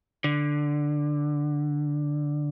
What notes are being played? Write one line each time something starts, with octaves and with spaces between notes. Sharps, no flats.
D3